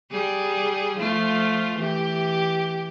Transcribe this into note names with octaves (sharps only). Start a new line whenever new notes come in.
G3 G#4
F3 A3 F4
E3 G4